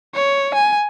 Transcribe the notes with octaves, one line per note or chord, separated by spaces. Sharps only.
C#5
G#5